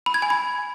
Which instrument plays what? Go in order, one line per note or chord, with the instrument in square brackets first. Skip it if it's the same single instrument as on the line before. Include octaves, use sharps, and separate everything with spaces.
[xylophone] B5
G#6
G#5
B5